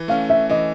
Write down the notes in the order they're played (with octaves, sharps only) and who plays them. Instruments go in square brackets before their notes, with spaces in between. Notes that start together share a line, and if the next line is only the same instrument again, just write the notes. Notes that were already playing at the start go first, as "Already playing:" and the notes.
Already playing: [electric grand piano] E3
[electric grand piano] A3 C#4 [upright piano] F5
[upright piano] E5
[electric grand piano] E3 [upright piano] D#5